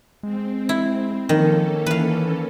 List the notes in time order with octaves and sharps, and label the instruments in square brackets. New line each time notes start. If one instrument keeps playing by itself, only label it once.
[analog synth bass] G#3 [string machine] C4
[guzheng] E4
[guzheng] D#3 [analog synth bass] F3 [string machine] A#3 C#4 A4
[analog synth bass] E3 [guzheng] B4 F5